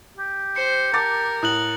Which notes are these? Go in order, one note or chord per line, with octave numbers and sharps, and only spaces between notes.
G4
C5 C#7
A#4 A5 D6 A6
A2 D#6 F#6 F#7